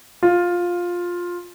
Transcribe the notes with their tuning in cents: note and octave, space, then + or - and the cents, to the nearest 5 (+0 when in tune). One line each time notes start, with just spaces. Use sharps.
F4 +10